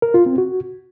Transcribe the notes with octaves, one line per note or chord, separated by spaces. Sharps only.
A#4
F4
C4
F#4